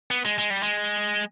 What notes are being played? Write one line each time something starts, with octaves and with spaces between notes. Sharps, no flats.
B3
G#3
G#3
G3
G#3